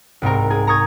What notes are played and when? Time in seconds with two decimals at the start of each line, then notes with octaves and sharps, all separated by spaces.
0.22 C2 G#2 C4 A#4
0.50 G#4 G#5
0.67 A#5 C#6 D#6 G#6